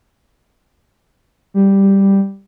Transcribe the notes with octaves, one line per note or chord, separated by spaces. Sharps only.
G3